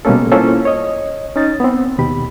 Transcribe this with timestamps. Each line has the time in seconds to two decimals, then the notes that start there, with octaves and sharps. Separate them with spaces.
0.05 B2 G3 G#3 A#3 C#4 A4
0.32 A#3 C#4 E4 F4 A4 C5
0.65 C#5 D#5
1.36 C#4 D#4 A6
1.60 B3 C4
1.99 D#2 B2 G4 B5